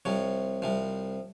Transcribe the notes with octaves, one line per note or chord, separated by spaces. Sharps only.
C2 C3 F3 C#5
C2 C3 F3